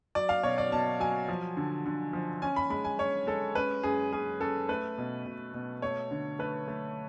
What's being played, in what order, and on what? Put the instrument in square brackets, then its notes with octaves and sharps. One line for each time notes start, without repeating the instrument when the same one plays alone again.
[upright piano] F#3 D5
F5
B2 C#5
D5
B2 A5
F#3 G#5
F3
D3
D3
F3
C#4 G#5
B5
G#3 B5
G#5
C#4 C#5
G#3 A4
C#4 B4
F#2 G#4
C#4 G#4
C#4 A4
A3 B4
B2
B2
B2
A3 C#5
D3
A3 B4
A3